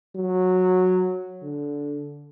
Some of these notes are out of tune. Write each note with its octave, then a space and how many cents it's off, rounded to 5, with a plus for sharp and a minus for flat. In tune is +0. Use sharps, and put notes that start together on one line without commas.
F#3 -10
D3 -15